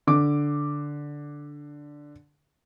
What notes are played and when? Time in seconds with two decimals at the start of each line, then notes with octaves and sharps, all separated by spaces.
0.07 D3 D6